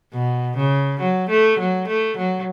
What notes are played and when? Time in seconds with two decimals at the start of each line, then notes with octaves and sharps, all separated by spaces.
0.13 B2
0.57 C#3
1.00 F#3
1.29 A3
1.59 F#3
1.88 A3
2.17 F#3